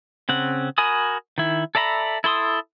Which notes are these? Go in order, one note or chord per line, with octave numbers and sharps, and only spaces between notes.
C#3 C4 F#5
F#4 A#4 G#5 B5 D#6
D#3 E4
A4 D5 E5 A#5 B5
E4 A4 C6 D#6